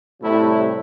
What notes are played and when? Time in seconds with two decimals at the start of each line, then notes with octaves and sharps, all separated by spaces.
0.22 A2 C3 G3 E4